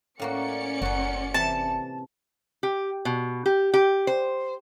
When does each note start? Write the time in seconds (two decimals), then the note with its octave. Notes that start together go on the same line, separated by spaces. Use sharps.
0.20 A2 A#3 C#4 F#4 D5 C#7
0.82 F#1 F#3 F#4
1.34 C3 E3 A5
2.63 G4
3.05 B2
3.46 G4
3.74 G4
4.07 C5